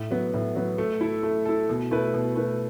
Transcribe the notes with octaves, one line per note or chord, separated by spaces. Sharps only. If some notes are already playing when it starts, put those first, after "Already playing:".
Already playing: A2
F#3 B3
A2
F#3 B3
A3
E4 A4
A3
E4 A4
B2
A3 E4 B4
B2
A3 E4 B4